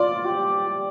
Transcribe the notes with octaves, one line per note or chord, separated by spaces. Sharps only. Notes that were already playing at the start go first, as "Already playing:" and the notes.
Already playing: F4 D5
G4